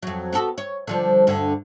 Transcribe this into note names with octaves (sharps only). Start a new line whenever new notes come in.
F2 F#3
B3 F#4 A4
C#5
D3 F3 G3
D2 G2 D3